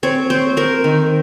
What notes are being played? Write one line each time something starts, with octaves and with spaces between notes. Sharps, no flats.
C4 C#5
C4 C5
C4 A#4
D#3